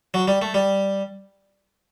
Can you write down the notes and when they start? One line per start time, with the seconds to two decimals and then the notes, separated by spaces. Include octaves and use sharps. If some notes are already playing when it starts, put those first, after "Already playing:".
0.14 F#3
0.28 G3
0.42 A3
0.54 G3